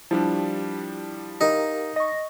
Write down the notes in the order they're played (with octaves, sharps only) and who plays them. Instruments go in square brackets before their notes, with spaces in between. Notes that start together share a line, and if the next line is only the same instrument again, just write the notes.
[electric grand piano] F3 G3 D4 [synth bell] E4 [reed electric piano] G4 A5
[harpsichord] D#4 [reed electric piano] G4 A#4 F5
[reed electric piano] D#5 [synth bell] C#6 A#6